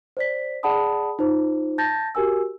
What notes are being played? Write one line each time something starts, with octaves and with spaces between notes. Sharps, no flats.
C5 D5 B6
G#4 D5 F#5 A5 B5 D#6
D#4 F4 C5
A5 G6 A6 A#6
F#4 G4 A#4 G#5 E6